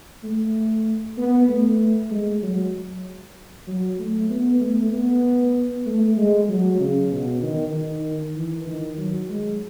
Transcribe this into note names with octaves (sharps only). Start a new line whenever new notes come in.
A3
B3
A3
G#3
F#3
F#3
A3
B3
A3
B3
A3
G#3
F#3
C#3
B2
D#3
D#3
E3
D#3
F#3
G#3